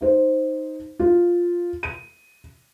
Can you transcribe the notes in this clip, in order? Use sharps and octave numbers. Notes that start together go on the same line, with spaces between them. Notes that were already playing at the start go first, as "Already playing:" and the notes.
D#4 C5
F4
D#7